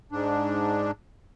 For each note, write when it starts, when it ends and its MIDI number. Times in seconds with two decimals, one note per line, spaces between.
0.12 0.91 44
0.12 0.91 62